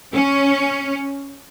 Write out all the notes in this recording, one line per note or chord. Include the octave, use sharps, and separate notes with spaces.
C#4